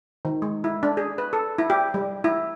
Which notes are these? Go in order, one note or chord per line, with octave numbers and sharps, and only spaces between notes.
D#3
G#3
E4
D4
G#4
B4
A4
E4
G4
G3
E4